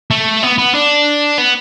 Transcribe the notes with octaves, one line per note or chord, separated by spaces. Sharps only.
A3
B3
B3
D4
B3